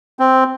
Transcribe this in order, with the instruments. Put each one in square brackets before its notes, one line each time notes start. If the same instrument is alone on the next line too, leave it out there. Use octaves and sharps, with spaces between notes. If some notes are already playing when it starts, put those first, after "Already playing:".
[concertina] C4